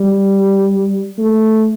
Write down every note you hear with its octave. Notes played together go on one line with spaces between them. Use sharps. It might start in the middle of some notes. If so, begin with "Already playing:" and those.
Already playing: G3
A3